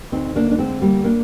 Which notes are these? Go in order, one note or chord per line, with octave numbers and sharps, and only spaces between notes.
D2 C4 D#4
A#3 D4
D4
D3 G#3 C4
G3 A#3
A#3 D4